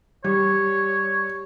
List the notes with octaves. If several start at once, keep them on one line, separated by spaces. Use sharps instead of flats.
G3 C#5